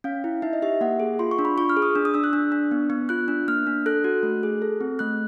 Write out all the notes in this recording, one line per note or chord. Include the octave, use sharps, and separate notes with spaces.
C#4 F5
E4
D#4 E5
D#5
G4 E5
A#3 F#5
G#4
F4 C6
C#6
D4
B5
F4 C#6
F6
G#4
D#6
D4
D#6
D4 E6
F#6
D4
D4
B3
B3
F4 F#6
D4
A#3 F6
D4
A4 F#6
F#4
A3
G#4
A4
C4
A3 F#6